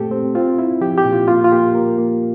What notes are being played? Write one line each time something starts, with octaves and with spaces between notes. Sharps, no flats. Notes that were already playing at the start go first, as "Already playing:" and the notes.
Already playing: A#2 A3 C4 G4 A4
C4
C4 F4
E4
F3 G4
G4
A#2
F4
A#3 F4
F4
A#3 G4
A#3 A#4
A#3